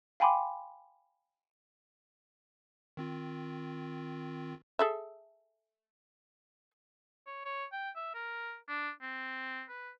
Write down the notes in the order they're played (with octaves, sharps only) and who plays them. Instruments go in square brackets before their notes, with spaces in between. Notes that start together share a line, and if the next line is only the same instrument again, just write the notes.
[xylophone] F5 G5 G#5 B5 C6 D6
[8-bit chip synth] D#3 C4 F4
[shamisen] G#4 A4 E5
[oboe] C#5
C#5
G5
E5
A#4
D4
C4
B4